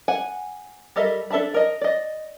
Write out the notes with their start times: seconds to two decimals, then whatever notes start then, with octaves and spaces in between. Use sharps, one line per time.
0.08 F#5 G#5
0.96 G3 A4 A#4 D#5 E5
1.30 D4 A4 E5 A5 B5
1.54 A#4 D#5
1.81 D5 D#5